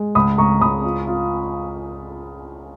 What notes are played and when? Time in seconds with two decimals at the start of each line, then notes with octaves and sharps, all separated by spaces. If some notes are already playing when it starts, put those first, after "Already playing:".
Already playing: G#3
0.15 C#2 B5 D#6
0.38 C#2 A#5 C#6
0.61 C#2 B5 D#6
0.84 F4
1.07 F4